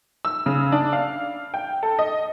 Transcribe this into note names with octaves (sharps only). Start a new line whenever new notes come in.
E6
C#3
D4
F5
G5
A4
D#5